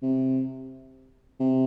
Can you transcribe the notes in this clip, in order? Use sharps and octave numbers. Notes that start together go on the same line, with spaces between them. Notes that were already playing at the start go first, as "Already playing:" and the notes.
C3
C3